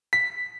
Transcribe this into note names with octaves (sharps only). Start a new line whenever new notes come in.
B6